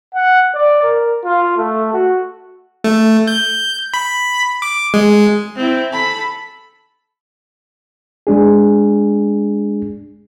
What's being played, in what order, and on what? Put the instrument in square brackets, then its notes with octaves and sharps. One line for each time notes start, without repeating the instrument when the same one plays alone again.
[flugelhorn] F#5
D5
A#4
F4
A3
F#4
[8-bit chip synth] A3
G6
B5
D6
G#3
[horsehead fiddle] C4 E4
A4 B5
[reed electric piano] G#3 D4 G#4